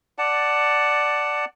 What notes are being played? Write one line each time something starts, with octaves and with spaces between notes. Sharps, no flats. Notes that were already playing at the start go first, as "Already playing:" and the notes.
D5 F#5 A5